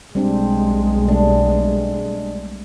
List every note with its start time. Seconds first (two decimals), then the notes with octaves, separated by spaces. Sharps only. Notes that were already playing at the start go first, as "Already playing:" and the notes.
0.15 B1 G3 G#3 C4 D4
1.08 G3 A3 D4